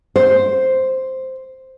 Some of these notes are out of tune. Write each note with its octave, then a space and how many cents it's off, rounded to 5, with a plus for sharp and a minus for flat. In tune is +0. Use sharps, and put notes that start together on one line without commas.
C5 +0